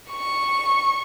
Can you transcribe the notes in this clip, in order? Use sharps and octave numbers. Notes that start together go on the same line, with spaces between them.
C#6